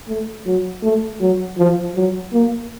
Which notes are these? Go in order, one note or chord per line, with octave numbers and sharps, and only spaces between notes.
A3
F#3
A3
F#3
F3
F#3
A#3